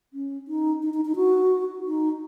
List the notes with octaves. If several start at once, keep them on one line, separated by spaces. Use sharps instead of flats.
C#4
D#4
D#4
D#4
D#4
F#4
D#4